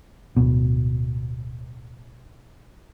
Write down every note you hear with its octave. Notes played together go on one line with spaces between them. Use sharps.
D1 B2